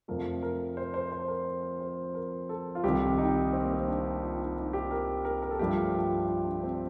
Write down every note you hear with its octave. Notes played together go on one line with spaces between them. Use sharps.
F2 C3 F3 A3 A#4
A#4
C5
C5
C5
A#4
C5
A#4
A4
F4
C2 C3 D#3 G4
D#4
C4
A#3
C4
D4
F4
D#4
D#4
G4
A#4
A#4
A#4
A4
G2 F3 A3 G4
F4
F4
D4
C4